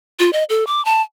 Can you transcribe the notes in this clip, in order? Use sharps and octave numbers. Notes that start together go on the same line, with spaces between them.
F4
D#5
A4
D6
A5